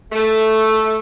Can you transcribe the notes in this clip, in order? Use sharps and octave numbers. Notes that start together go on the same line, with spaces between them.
A3